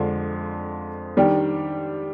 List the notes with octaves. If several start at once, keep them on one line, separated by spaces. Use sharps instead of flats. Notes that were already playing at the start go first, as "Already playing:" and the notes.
Already playing: F2 D3 F3 G#3 D4
D#3 G3 D4 G4